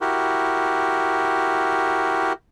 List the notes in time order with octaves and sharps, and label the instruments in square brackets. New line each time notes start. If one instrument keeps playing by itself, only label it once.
[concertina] E4 F#4 G4 A#4